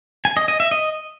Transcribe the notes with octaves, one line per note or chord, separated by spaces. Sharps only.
G#5
D#5
D#5
E5
D#5